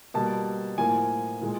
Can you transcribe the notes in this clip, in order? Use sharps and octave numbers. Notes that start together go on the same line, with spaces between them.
B2 G3 A#3 A5
A2 F3 A#3 G#5
A#2 F3 G#3